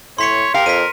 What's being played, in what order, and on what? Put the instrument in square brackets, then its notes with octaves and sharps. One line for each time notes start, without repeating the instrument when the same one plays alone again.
[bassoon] A2 [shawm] C#5 [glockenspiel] C6 B6 C#7
[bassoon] G4 [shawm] A#4 [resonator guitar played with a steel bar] F5
[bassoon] F2 [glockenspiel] B6 D#7